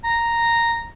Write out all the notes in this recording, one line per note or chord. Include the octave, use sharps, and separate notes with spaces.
A#5